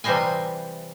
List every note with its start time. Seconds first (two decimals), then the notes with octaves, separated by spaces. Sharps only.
0.04 C3 E3 G3 C5 D#5 G#5